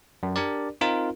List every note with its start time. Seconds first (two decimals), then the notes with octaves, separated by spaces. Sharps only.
0.23 F#2
0.36 D4 G4 A#4 D5
0.81 C4 D#4 F4 A#4